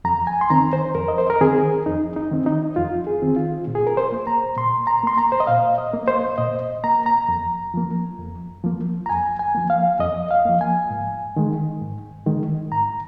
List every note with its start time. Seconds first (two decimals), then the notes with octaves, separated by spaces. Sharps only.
0.05 F2 A#5
0.27 G#5
0.41 C6
0.50 D#3 C4 A#5
0.73 C5
0.95 F2 A#4
1.08 D#5
1.18 C5
1.30 A#4
1.41 D#3 C4 G#4
1.86 F2 D#4
2.16 D#4
2.31 D#3 C4
2.46 D#4
2.76 F2 F4
3.07 G#4
3.22 D#3 C4
3.36 F4
3.67 A#2
3.75 G#4
3.87 A#4
3.97 C5
4.12 A#3
4.27 A#5
4.57 A#2 C6
4.87 A#5
5.03 A#3 C6
5.18 A#5
5.32 C5
5.40 D#5
5.47 A#2 F5
5.78 D#5
5.93 A#3
6.08 C5
6.38 A#2 D#5
6.84 A#3 A#5
7.06 A#5
7.28 F2
7.74 F3 A#3
8.19 F2
8.64 F3 A#3
9.06 A#5
9.09 F2 G#5
9.39 G#5
9.55 F3 A#3
9.70 F5
10.00 F2 D#5
10.31 F5
10.45 F3 A#3
10.61 G#5
10.90 G#2
11.36 D#3 G#3
11.81 G#2
12.26 D#3 G#3
12.71 G#2 A#5